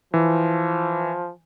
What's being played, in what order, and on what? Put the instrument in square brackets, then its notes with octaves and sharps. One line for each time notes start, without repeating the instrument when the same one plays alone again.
[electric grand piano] E3 [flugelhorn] F3